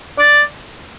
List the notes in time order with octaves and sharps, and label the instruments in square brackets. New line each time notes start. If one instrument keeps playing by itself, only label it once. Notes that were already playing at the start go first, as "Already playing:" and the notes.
[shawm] D5